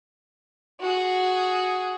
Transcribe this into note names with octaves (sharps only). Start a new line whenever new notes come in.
F#4 G#4